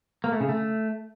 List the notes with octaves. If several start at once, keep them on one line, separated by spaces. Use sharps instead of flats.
A#3
A3
C#3
A3